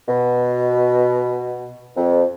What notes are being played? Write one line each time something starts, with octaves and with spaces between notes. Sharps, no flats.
B2
F2